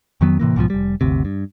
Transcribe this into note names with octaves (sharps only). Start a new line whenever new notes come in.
F2 D#3 F#3 B3
A2 C3 E3 A#3
B1 G#2 B2 F3
F1 G3
G1 D2 C3
G2